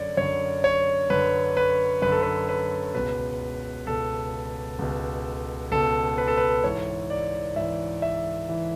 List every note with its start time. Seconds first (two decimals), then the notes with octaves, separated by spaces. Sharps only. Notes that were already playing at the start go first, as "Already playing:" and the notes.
Already playing: F#2 D3 C#5 D5
0.17 F#2 D3 C#5
0.64 C#5
1.10 F#2 D3 B4
1.57 B4
2.02 F#2 D3 B4
2.12 A4
2.23 B4
2.49 B4
2.95 C#2 B2 B4
3.87 C#2 B2 A4
4.79 C#2 B2
5.72 C#2 B2 A4
6.18 B4
6.28 A4
6.37 B4
6.64 G#2 E3 C#5
7.10 D5
7.56 G#2 E3 E5
8.02 E5
8.49 E3